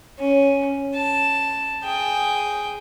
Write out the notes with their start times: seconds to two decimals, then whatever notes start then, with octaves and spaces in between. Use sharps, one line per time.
0.19 C#4
0.94 A5
1.84 G#4 G5